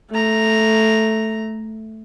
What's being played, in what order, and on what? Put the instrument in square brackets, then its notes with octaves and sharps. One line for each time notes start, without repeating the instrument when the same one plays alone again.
[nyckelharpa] A3 A#5